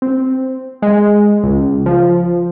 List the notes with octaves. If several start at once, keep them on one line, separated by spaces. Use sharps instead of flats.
C4
G#3
C#2
F3